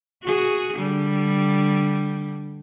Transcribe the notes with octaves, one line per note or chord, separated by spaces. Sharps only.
F#4 G#4
D3 G3